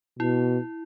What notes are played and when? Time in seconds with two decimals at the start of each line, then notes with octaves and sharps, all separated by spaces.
0.19 B2 E4